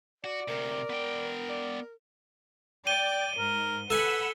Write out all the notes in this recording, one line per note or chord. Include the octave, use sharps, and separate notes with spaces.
F#4 D5
D2 C3 A#4
B3 G5
D5
D5 G5 D#7 G7
G#2 A#4
A4 B4 F#5 G#5 B5 E6